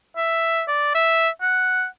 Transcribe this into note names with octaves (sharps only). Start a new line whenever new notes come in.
E5
D5
E5
F#5